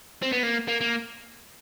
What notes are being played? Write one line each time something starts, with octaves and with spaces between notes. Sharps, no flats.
C4
B3
A#3
A#3
A#3